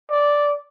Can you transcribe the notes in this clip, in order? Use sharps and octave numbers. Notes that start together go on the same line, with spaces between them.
D5